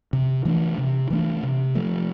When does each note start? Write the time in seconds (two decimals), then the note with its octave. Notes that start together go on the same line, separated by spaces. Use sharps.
0.13 C3
0.45 E3 A3 D4
0.78 C3
1.10 E3 A3 D4
1.43 C3
1.75 F3 A3